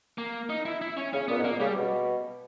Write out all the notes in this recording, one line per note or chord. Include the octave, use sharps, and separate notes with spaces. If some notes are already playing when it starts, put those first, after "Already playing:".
A#3
D#4
E4
E4
C#4
C#3 C#4
A#2 B3
G#2
A#2 A#3
C#3 G3
B2